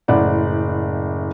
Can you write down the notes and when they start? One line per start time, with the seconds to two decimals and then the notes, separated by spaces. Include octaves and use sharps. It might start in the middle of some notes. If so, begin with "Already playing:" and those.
0.08 F#1 A2 D5 F#5